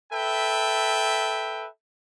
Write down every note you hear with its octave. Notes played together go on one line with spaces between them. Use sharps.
A4 B4 E5 G5